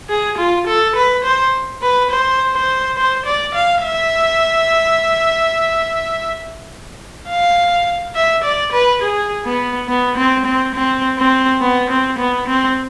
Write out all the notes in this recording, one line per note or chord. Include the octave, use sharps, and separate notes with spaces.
G#4
F4
A4
B4
C5
B4
C5
C5
C5
D5
F5
E5
F5
E5
D5
B4
G#4
B3
B3
C4
C4
C4
C4
B3
C4
B3
C4